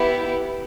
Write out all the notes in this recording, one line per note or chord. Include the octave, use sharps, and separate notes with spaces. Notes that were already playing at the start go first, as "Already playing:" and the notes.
Already playing: B3 E4 G4